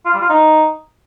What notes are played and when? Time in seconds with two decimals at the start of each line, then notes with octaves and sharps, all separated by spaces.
0.05 F4
0.13 G3
0.21 F4
0.29 D#4